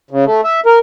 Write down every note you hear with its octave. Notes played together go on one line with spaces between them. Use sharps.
C#3
A3
E5
A#4